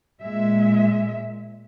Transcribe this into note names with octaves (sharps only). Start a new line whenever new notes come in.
A#2 G#3 E5